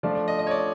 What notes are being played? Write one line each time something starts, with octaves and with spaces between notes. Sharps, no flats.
F3 A3 D4 F4 D5
D5
D#5
D#5
C#5
D5